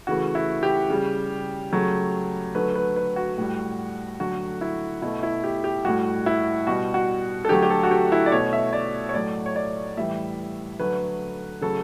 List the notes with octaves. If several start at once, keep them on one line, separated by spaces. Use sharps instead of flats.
C#3 E3 A3 F#4
E4
G4
C#3 G3
C#3 F#3 A3
D3 F#3 A3 B4
B4
B4
F#4
A2 G3
D3 F#3 A3 F#4
E4
B2 A3 E4
E4
G4
G4
A2 G3 F#4
E4
B2 G3 F#4
F#4
A4
D3 F#3 A3 G4
G4
A4
F#4
G4
E4
D5
B2 A3 C#5
E5
D5
C#5
A2 F#3 A3 D5
C#5
D5
A2 E3 G3 E5
D3 F#3 A3 B4
C#3 F#3 A3 A4